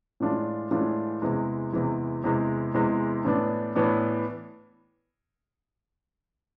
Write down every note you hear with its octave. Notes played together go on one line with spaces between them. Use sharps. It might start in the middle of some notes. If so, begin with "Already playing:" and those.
A2 E3 G#3 D4 F4
A2 E3 G#3 D4 F4
E2 C3 E3 G#3
E2 C3 E3 G#3
E2 C3 E3 G#3
E2 C3 E3 G#3
A2 E3 B3 D4
A2 E3 B3 D4